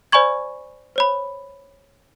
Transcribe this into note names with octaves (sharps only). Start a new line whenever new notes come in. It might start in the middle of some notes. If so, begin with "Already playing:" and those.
C5 D5 G#5 B5 C#6 G#6
C5 C#5 B5